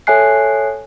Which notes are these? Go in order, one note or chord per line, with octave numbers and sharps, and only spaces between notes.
A4 C#5 E5 G#5 F#6 C7